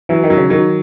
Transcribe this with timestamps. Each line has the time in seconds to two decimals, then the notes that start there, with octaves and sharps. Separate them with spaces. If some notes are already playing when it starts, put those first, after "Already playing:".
0.09 E3 F#3
0.24 D#3
0.30 F#3
0.37 C#3
0.50 D#3 F#3